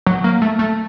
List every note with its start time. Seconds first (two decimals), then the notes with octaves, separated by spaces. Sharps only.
0.07 F#3
0.24 A#3
0.42 A3
0.59 A3